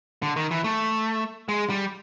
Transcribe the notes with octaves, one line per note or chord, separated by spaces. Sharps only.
D3
D#3
E3
A3
G#3
G3